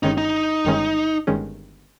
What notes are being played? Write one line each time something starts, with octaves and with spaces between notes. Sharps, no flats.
G1 G2 D#3 G#3 C#4 D#4
D#4
G1 G2 D#3 G#3 C#4
G1 G2 D#3 G#3 C#4